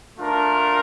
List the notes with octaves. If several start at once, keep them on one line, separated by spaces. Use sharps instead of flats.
A3 D4 F4 A#4